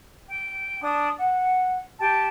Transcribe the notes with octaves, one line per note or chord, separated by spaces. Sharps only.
G5
D4 D#6
F#5
G4 G5 A5